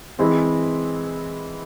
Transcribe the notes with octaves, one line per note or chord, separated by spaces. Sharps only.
E3 G#3 C4 E4